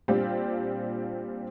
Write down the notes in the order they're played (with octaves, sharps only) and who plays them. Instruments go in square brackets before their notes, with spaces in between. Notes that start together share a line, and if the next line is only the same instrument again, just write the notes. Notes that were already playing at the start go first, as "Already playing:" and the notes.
[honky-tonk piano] A#2 G3 C4 D4 F4 G4